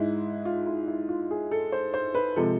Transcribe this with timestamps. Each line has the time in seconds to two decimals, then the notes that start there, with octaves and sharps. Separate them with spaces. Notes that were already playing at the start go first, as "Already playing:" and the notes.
Already playing: G#2 G#3 E4
0.45 F4
0.66 E4
0.88 E4
1.09 F4
1.31 G#4
1.51 A4
1.72 C5
1.94 C5
2.15 B4
2.36 C3 F3 G#3 A4